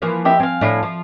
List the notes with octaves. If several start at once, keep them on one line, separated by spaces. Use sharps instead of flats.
E3 F3 A#3
G4 D#5 E5
C4 F5 G#5
A2 D4 E4
F3